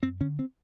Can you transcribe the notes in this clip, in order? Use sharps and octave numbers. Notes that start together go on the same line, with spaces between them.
F#2 C4
D3 C#4
C4